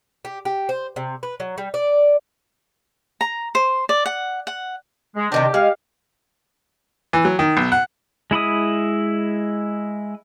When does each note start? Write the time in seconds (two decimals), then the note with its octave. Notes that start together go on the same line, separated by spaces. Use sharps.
0.25 G4
0.45 G4
0.69 C5
0.96 C3
1.23 B4
1.40 F#3
1.58 G3
1.74 D5
3.21 A#5
3.55 C5
3.89 D5
4.06 F#5
4.47 F#5
5.16 G#3
5.32 C3 D#3 C4 D4 G4
5.54 G#3 G4 F5
7.13 E3
7.25 F#3
7.39 D#3
7.57 B1
7.72 F#5
8.31 G#3 E4 B5 D#6